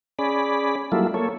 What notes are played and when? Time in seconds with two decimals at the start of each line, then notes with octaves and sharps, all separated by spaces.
0.19 C#4 G#4 D5 B5
0.92 F#3 G3 A#3 E4 F4 A4
1.14 A#3 A4 C#5